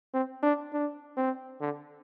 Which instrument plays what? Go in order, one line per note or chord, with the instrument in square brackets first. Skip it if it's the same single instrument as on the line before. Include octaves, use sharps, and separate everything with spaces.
[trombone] C4
D4
D4
C4
D3